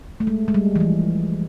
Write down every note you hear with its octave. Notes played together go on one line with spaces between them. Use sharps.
A3
G#3
G#3
G3
E3
F3